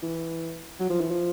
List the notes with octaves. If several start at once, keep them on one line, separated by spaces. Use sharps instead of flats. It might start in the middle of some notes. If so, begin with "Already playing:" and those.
E3
F#3
F3
E3
F3